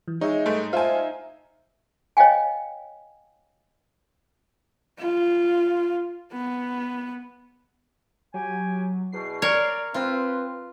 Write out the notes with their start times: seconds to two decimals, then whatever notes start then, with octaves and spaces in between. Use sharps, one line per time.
0.08 E3
0.21 G#3 D#4 C#5 E5
0.46 G#2 A3
0.73 F4 C5 E5 G#5 A5
2.17 C#5 D#5 F5 G5 G#5
4.99 F4
6.32 B3
8.34 F#3 G4 G5 G#5
9.12 E2 B2 C7
9.42 A#4 C#5 D5
9.94 C4 F4 B4